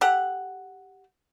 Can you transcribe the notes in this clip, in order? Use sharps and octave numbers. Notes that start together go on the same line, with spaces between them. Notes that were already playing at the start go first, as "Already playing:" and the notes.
G4 A4 F#5